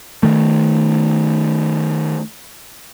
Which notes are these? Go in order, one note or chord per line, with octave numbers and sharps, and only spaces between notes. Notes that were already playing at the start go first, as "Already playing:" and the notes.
D#3 A3